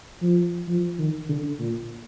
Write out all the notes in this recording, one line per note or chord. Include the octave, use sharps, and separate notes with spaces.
F3
F3
D#3
D3
A#2